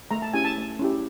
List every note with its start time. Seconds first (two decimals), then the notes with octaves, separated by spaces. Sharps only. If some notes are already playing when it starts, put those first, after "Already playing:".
0.11 A3 A#5
0.22 A5
0.34 C#4 E4 G4 G#5
0.45 A5
0.57 A3
0.79 C#4 E4 G4